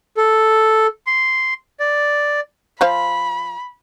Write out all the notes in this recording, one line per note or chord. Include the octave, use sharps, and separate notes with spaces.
A4
C6
D5
F3 C5 F5 B5